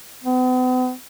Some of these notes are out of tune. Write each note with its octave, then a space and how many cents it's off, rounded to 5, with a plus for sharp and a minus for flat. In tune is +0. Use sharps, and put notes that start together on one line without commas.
B3 +45